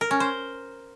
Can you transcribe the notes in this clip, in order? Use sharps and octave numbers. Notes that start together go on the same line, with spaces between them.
A#4
C#4
C5